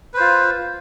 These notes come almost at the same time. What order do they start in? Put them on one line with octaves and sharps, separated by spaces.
B4 C5 F4